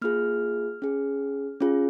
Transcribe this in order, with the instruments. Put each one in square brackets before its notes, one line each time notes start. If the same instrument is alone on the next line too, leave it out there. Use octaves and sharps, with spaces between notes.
[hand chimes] A#3 F4 G#4 F6
C#4 G#4
C#4 F4 G#4